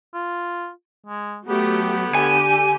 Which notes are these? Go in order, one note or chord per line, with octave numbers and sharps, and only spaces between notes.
F4
G#3
F#3 A3 B3 G4
D3 G4 G#5